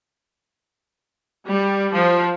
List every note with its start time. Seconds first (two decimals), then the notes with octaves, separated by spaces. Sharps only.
1.48 G3
1.93 F3